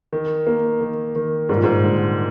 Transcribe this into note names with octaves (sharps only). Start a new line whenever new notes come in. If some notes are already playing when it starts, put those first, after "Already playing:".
D#3
A#3
D#3
D#3
G#2 G3
A#2
G#2
D3